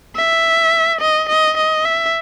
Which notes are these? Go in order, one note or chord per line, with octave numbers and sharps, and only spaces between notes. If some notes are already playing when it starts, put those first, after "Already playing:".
E5
D#5
D#5
D#5
E5